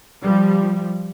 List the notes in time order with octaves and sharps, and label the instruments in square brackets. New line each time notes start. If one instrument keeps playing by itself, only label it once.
[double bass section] F3 G3